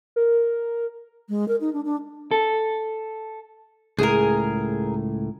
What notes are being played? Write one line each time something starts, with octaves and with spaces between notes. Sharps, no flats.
A#4
G#3
A#4
D#4
D4
D4
A4
C#2 A2 G#4 A#4